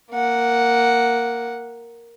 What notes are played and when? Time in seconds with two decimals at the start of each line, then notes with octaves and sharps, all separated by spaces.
0.12 A#3 F#5